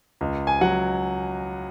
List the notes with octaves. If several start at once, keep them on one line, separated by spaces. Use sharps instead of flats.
C#2
G#5
F#3 F#5